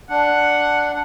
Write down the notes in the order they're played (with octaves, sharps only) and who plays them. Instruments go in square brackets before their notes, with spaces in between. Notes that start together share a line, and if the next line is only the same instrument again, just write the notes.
[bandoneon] D4 [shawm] F#5